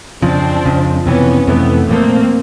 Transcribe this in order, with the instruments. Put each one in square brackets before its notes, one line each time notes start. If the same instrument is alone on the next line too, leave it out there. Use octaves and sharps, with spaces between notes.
[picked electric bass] F2 C#3 F3 [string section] C4 D4
[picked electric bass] F2 C#3 F3
[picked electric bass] F2 C3 E3 [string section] B3 C#4
[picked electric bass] F2 C3 E3 [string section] A3 B3
[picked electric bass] A#2 F3 A3 [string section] A#3 C4